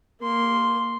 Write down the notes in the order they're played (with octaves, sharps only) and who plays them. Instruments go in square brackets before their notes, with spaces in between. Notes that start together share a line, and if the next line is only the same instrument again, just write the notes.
[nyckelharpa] A#3 C6